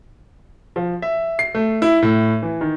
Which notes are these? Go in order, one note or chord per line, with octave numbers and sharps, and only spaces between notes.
F3
E5
C7
A3
E4
A2
E3
D#3